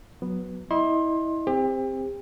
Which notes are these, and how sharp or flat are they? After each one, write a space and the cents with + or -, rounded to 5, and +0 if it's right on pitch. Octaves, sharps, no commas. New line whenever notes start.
F#3 +0 B3 +0
E4 -25 D#5 -25 C6 +25
C4 +0 G4 +35